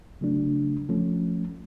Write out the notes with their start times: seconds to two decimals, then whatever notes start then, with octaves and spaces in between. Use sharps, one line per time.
0.21 C#3 F#3 A3 D4
0.89 F3 A3 C#4